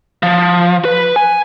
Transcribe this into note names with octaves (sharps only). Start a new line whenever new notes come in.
F3
B4
G#5